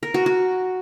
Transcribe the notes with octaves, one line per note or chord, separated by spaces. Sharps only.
A#4
F#4
F#4